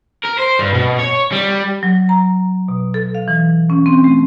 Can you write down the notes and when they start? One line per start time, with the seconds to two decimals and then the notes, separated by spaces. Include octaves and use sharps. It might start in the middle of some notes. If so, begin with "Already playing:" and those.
0.24 A#4
0.39 C5
0.59 G2
0.74 B2
1.00 C#5
1.33 G3
1.83 F#3
2.09 A#5
2.68 B2
2.94 A4
3.15 F5
3.28 E3
3.70 C#4
3.86 C4
4.04 A3